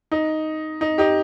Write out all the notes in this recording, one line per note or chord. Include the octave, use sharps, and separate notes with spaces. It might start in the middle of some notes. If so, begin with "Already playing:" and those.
D#4
D#4
D#4 G4